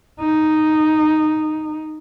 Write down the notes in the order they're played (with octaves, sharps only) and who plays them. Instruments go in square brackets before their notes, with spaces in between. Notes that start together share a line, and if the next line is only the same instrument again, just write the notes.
[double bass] D#4